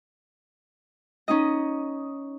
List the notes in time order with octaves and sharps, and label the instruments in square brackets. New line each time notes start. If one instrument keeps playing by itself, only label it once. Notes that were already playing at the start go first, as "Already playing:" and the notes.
[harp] C#4 D#4 D#5